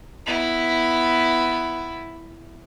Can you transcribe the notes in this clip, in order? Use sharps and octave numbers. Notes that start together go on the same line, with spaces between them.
B3 E4